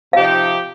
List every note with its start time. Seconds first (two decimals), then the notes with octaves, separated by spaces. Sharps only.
0.13 C3 F3 D#4 G4 F5